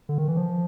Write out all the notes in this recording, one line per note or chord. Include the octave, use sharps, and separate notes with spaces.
D3
D#3
E3
F3